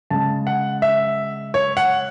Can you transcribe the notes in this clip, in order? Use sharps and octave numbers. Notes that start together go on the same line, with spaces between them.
C#3 G#3 A5
F#5
E5
C#5
F#5